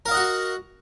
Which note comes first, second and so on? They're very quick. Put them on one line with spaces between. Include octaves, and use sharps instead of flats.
A#4 F5 D#5 F#5 F#4